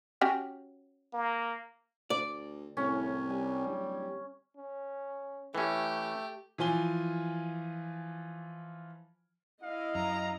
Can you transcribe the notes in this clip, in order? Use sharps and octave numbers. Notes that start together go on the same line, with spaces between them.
C#4 F#4 G4
A#3
D2 D5
C2 A2 C#4
G3 G#5
D1
C#4
E3 A3 C#4 G4
E3 F3 F4 G#5 G7
E4 D#5 F5
F#2 A#5